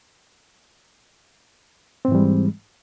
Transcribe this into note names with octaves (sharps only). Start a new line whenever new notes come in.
G#2 E3 G3 G#3 C4